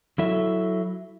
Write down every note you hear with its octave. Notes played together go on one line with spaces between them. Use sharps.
F#3 E4 A4 E5